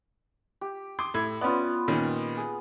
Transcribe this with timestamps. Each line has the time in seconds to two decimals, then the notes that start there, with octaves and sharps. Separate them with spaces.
0.61 G4
0.99 C6 D6 D#6
1.14 A2 E4 G#6
1.41 B3 C#4 F4 D5
1.88 A#2 D#3 C#4
2.37 G#4